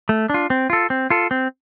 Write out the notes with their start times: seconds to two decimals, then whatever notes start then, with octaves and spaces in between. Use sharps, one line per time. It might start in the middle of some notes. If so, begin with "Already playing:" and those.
0.09 A3
0.30 D4 F4
0.50 C4
0.70 F4 A4
0.90 C4
1.10 F4 A4
1.31 C4